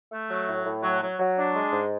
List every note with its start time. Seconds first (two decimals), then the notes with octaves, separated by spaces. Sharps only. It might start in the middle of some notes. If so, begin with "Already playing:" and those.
0.10 A3
0.29 F#3
0.47 A2
0.64 A2
0.83 F#3
1.01 F#3
1.19 F#3
1.36 D4
1.55 G#3
1.73 G#2